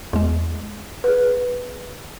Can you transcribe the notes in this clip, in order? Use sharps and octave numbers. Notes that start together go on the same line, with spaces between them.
E2 G#3
G#4 B4